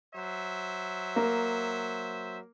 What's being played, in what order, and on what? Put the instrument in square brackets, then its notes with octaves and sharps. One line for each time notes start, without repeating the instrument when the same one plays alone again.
[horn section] F#3 C5 E5
[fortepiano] A#3